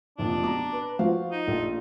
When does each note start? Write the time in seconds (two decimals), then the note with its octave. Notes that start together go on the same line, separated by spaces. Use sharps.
0.19 F1 A#2 D4
0.44 B2 A#5 D6
0.73 B4
0.99 F3 F#4 C5 F5
1.32 D#4
1.47 A#1 A3 F4 A4